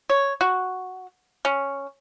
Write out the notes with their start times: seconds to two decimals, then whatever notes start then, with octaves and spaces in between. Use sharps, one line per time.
0.10 C#5
0.41 F#4
1.45 C#4